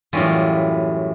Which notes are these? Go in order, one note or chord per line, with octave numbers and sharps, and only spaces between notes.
F#2 A2 E3 G3 F4